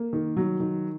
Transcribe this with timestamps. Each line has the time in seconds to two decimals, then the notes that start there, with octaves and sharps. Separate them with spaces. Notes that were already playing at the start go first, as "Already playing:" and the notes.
Already playing: A#3
0.13 D#3
0.37 F#3
0.60 D#3